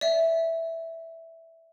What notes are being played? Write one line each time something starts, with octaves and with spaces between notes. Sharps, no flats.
D5 E5